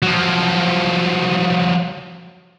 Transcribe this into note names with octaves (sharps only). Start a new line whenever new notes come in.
F3 F#3